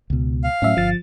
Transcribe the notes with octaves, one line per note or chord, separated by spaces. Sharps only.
C#2 B2
F5
A2 F#3 C#4 E5
G1 F3 A6